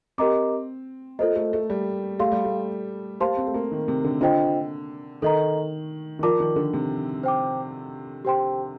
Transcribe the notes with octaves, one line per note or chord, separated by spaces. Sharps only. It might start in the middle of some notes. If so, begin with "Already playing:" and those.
C4 G4 A#4 D#5 A#5 D6
A#3 F4 A4 C5 D#5
A3
A3
G3
A3 G4 D5 F5 C6
G3
A3
A#3 G4 C5 F5 A5 C6
C4
A3
A#3
D#3
C3
D3
D3 D4 F4 C5 D#5 G5
D#3 A4 D#5 A#5
D#3
F3 F4 A#4 D5 A5 D6
D#3
D3
C3
C5 G5 D6
G4 C5 G5 C6